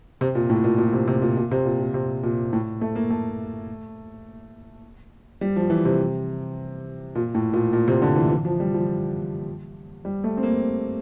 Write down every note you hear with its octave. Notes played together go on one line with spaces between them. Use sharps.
C3
A#2
A2
A#2
A#2
C3
C3
A#2
A#2
C3
A#2
A#2
C3
A#2
A2
A3
A#3
A3
G3
F3
E3
C3
A#2
A2
A#2
A#2
C3
D3
E3
E3
F3
G3
F3
G3
A3
C4
A#3